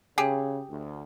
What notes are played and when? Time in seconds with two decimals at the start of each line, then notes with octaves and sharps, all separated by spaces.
0.18 C#3 G4 G#4
0.70 D2